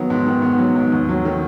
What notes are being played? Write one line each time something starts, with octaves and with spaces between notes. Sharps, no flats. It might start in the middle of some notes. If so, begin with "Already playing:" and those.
Already playing: D#3 F#3 B3
G#2
D#3
B3
F#3
G#2
D#2
F#3
D#3